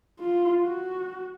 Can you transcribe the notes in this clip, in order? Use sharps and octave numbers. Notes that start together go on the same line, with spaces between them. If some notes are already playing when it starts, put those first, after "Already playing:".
F4
F#4